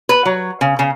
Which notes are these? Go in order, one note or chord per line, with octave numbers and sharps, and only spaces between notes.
B4
F#3
C#3
C#3